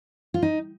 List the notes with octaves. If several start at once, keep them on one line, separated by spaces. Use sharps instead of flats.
F4
D#4